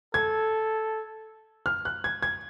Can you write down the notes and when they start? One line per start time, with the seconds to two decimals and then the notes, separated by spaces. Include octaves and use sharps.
0.14 A4 G#6
1.66 F6
1.85 F#6
2.04 G#6
2.23 G#6